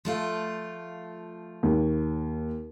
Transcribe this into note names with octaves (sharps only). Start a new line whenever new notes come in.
F3 A3 F4
D#2